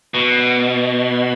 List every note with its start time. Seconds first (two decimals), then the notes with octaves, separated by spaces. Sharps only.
0.14 B2